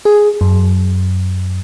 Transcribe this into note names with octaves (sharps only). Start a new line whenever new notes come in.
G#4
F#2